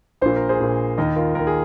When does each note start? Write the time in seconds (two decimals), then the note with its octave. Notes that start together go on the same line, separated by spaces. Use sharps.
0.21 A#1 A#2 C5
0.36 A#4
0.49 G#4 C5
0.60 A#1 A#2
0.98 D#2 D#3 A#4 D#5
1.16 F4 A#4
1.35 D#2 D#3 A#4
1.47 G#4